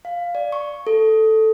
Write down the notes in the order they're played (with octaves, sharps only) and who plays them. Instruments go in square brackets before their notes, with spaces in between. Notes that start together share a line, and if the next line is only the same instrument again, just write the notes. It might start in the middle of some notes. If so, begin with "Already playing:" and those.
[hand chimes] F5
D5
C#6
A4